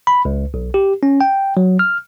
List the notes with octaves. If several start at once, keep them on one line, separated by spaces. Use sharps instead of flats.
B5
C#2
B1
G4
C#4
G5
F#3
F6